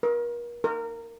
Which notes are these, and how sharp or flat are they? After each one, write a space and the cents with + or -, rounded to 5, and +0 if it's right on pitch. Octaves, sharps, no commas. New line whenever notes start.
A#4 +40
A#4 -15